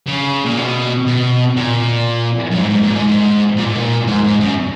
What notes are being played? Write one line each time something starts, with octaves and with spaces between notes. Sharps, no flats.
C#3
A#2
B2
B2
A#2
F#2
G#2
G#2
A#2
G#2
G#2
A#2
G#2
A#2
G#2
G#2
F#2